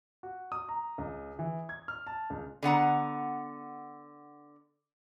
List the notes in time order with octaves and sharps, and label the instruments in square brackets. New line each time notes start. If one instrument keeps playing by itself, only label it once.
[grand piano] F#4
D#6
A#5
C#2
E3
G#6
F6
A5
C#2
[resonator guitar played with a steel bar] D3 B3 F#5 A#5